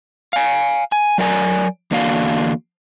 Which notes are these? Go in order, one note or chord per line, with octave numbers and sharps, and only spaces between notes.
F5 G#5
G#5
F#3 A#4 D5 F5 G#5 A#5
E2 D3 A#3 D4 F#4 F5